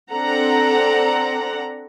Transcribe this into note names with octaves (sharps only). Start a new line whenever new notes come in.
C4 D4 A4 F#5 A#5